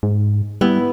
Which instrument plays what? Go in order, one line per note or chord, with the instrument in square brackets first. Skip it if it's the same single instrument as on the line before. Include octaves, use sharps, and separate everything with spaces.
[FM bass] G#2
[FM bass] G3 [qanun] B3 E4